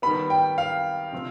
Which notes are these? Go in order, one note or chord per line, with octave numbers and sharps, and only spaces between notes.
D#3 G3 B3 B5
G5
F5
C3 F3 C4